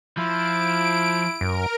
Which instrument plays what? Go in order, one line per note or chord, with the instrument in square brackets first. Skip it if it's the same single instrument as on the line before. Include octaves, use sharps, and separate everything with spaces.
[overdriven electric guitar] F3 [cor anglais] E4 [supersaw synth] D7
[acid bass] F#2 [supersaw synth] A#4